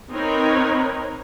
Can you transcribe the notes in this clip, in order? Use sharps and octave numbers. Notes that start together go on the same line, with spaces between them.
C4 D#4 A#4 B4 C#5